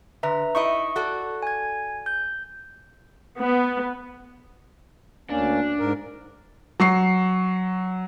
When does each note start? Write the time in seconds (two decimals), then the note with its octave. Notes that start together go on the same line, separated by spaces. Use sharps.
0.23 D3 B4 E5 A#5
0.55 D#4 E4 D#5 C#6
0.96 F#4 A4 D5
1.43 G#5 G#6
2.06 G6
3.37 B3
5.30 D2 A#3 C#4 D4
5.79 G#2 A#4
6.80 F#3 C#6 C7